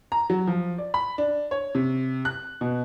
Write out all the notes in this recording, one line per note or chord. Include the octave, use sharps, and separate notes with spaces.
A#5
F#3
F3
D5
B5
D4
C#5
C3
F#6
B2